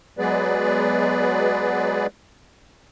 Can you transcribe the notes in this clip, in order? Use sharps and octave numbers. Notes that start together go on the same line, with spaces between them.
F#3 G#3 B3 G#4 B4 D5